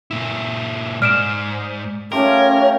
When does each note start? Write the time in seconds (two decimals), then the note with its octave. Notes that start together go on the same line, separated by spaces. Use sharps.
0.11 A#2 E4
1.02 G#2 D5 F6 D7 E7
2.12 A3 C#4 F4 G4 A#4